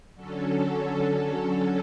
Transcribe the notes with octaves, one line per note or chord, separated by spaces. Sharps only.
D3 F#3 C#4 A4